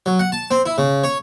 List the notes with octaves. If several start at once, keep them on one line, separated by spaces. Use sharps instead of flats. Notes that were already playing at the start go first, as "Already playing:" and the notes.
F#3
F#5
A5
C4
E4
C#3
C#5